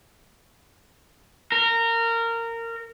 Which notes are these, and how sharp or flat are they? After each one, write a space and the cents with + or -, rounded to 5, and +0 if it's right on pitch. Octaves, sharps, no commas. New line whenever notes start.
A#4 -20